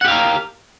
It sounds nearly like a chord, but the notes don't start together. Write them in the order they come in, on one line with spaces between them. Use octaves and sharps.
F#5 G4 F5 A#4